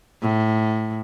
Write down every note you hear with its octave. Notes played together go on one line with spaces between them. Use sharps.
A2